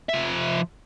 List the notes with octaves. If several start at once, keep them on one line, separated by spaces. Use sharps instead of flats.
F3 E5